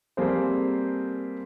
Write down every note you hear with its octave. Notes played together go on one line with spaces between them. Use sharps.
G3 A#3 C4 G#4 A4 C5